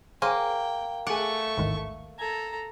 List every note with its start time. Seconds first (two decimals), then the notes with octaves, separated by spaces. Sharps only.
0.22 A#3 G#4 C5 C#5 G5
1.07 A3 G#4 F#5 C#6 D6
1.57 A1 D#2 G#2
2.19 A4 A#5 G#6